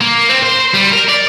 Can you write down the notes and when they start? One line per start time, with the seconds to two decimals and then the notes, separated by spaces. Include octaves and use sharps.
0.01 A#3
0.29 C4
0.43 C5
0.74 G3
0.92 A#4
1.09 D5